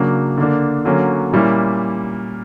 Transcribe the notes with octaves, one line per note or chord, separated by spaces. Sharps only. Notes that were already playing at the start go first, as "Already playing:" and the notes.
Already playing: C#3 F#3 A#3 D4
D3 A#3 D4
D3 F#3 A#3 C#4
A#2 G3 A#3 C#4 E4